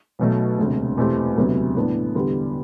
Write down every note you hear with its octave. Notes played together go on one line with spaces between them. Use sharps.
B1 B2 F#3 A3
E1 D2 C3
E2 B2 A3 C4 G4
E1 D2 C3 F#3 B3
A2 E3 B3 D4
E2 D3 G3 B3